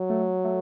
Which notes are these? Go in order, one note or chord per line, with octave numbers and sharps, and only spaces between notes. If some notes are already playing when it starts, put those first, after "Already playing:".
Already playing: F#3
A3
A3